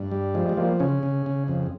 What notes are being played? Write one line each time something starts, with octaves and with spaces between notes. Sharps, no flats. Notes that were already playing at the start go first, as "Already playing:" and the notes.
Already playing: G2
G3
F3 G#3
G#3
F3 A#3
C#3 C#4
C#3
C#3
F2